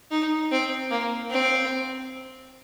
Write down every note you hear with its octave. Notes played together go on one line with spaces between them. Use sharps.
D#4
C4
A#3
C4